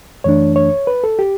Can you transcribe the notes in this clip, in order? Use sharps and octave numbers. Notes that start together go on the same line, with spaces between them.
F#2 E3 A3 D4 C#5
C#5
B4
A4
G4